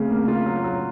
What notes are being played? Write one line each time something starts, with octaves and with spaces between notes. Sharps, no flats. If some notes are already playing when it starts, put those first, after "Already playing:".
Already playing: C#3 A3 C4
A#3
F4
F#3
F#3